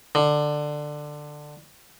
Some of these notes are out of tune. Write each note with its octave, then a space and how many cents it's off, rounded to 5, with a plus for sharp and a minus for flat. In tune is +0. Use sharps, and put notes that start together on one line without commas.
D3 +15